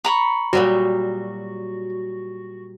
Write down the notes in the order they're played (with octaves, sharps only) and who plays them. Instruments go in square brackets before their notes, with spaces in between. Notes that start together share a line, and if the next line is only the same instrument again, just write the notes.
[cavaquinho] A#5 B5 C#6
[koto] A#2 F#3 G3 [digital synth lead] F#4